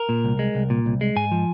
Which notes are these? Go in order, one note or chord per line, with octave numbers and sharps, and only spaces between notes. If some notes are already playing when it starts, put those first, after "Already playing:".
Already playing: A#4
A#2
C2
G#3
C2
A#2
C2
G#3
G#2 G#5
F3